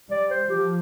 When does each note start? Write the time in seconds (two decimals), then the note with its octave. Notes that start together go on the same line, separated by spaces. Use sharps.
0.11 G3 D5
0.31 C5
0.49 F3 G4